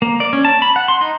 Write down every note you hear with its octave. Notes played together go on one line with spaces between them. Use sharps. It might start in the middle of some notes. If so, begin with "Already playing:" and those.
A#3
D5
C#4
A5
B5
F#5
C6
D#4